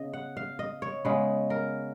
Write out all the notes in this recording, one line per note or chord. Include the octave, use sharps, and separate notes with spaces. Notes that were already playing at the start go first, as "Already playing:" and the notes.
Already playing: C#3 B3 D#5
F#5
F5
D#5
C#5
C#3 G#3 B3 B4
A#4